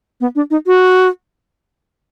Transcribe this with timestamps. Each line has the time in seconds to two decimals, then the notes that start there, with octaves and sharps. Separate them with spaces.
0.21 B3
0.35 D4
0.51 D#4
0.67 F#4